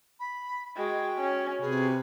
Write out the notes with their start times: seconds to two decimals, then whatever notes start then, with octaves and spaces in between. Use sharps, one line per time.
0.20 B5
0.76 G#3 F#4 G5
1.21 C#4
1.62 C3 G#4 B4